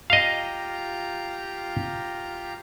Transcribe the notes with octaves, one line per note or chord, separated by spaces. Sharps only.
F4 G4 D#5 F5 A#5